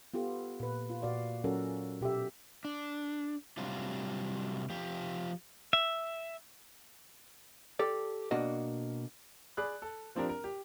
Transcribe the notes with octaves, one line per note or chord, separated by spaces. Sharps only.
B3 F4 G4 A4
A#2 B4
F4
A#2 F#4 D5 F5
F#3 C#4 F#4 A4 A#4
B2 G4 A4 E5
D4
C3 F#3 G3 D4 F4
F3 G4
E5
G4 A4 D5
B2 A#3 D4 F#4 D#5
G#4 D5 B5 F#6
A4
F3 C4 D4 G4 A#4
A#4
G4